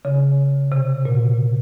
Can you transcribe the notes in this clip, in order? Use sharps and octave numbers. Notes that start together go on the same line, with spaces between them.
C#3
C3
A#2